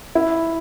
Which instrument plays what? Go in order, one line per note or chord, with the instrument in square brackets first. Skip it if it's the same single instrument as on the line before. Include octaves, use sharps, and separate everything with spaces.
[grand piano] E4